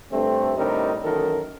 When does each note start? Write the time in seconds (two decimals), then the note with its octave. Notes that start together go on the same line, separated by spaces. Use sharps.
0.11 G2 A3 C4
0.57 A2 D3 G3 C4 D#4 A#4
1.04 F#2 D#3 E3 A#3 A4 A#4